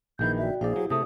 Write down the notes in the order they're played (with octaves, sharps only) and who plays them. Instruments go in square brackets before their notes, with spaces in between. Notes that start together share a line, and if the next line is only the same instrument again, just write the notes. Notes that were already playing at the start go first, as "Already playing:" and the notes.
[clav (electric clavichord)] A#1 D#3 E3 [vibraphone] G#4 A#4 B5 [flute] G6
[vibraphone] F#4 D5 G5 [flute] E5
[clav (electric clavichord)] A#1 D5 [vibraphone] E4 C5 F5 [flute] G#4
[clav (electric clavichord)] F#3 [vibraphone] E4 G4
[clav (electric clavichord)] C3 A3 [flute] D#6